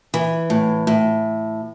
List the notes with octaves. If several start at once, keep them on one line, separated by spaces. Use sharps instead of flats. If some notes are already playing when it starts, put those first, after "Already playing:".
E3
A2
A2